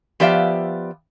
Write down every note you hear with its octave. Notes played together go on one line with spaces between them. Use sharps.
F3 B3 G4 D5 E5 F5